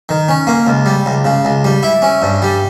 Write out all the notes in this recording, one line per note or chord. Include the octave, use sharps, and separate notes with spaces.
D#3
C#4
A#3
C#2
G3
C#2
C#3
C#2
G3
E4
C#4
G2
G3